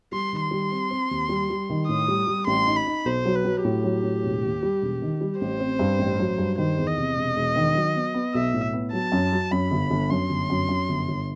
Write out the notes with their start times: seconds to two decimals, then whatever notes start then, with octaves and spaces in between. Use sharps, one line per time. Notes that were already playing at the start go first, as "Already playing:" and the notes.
0.12 G3 C6
0.33 D#3
0.42 C6
0.51 G3
0.72 C4
0.91 C4
1.11 D#2
1.29 G3
1.50 G3
1.69 D#3
1.89 A2 D#6
2.08 G3
2.27 G3
2.47 A1 C6
2.66 D#4
2.76 B5
2.87 D#4
3.05 B1 C5
3.25 F#3
3.36 B4
3.45 F#3
3.64 A2 G4
3.84 F#3
4.04 A2
4.23 E1
4.42 D#2
4.63 G3
4.82 E1
5.02 D#3
5.21 G3
5.41 A1 C5
5.60 C4
5.79 G2
5.99 A1
6.19 F#3
6.38 G2
6.58 D#3 C5
6.77 E2
6.87 D#5
6.97 C3
7.16 E1
7.36 E1
7.56 D#3
7.75 F#3
7.96 B3
8.14 B3
8.34 B1 E5
8.54 A2
8.73 B3
8.93 F#3 A5
9.12 F#2
9.32 F#3
9.51 F#2 B5
9.71 G1
9.91 G1
10.10 F#2 C6
10.30 G1
10.50 F#2
10.69 F#2
10.89 G1
11.08 G1